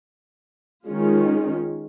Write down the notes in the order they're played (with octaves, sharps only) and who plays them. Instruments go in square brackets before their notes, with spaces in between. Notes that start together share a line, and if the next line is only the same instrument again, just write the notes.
[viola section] D#3 G#3 C#4 F4